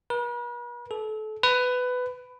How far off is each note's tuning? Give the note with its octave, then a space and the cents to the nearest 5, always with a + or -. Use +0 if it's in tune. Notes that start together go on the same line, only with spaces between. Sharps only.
B4 -45
A4 -30
B4 +15